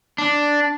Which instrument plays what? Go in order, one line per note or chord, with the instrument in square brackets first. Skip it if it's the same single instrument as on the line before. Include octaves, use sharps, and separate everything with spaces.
[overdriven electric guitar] D4